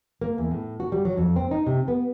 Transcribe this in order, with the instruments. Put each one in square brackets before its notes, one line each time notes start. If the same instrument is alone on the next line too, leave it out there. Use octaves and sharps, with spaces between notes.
[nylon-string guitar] A#3
E2
A2
F#4
G3
F#3
F2
C4
D#4
C3
B3